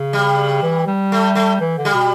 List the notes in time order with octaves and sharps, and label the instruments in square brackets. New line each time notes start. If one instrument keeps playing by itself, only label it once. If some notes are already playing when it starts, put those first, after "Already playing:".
Already playing: [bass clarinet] C#3
[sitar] G3
[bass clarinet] E3
G3
[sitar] A3
A3
[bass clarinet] E3
D3
[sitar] G3
[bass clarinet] B2